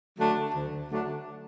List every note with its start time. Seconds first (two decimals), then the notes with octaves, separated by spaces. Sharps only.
0.19 D3 F#3 A3 D4
0.54 D2
0.89 D3 F#3 A3 D4